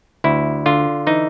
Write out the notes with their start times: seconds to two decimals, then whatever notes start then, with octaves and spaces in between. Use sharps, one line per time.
0.24 D2 E4
0.66 D3 F4
1.07 E3 D#4